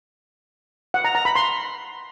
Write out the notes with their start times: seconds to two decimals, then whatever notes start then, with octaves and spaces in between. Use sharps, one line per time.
0.94 F#5
1.05 A#5
1.15 A#5
1.25 B5
1.36 C6